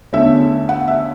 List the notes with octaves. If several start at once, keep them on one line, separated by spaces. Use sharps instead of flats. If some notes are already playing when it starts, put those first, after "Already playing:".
E2 D3 A3 C#4 E5
F#5
E5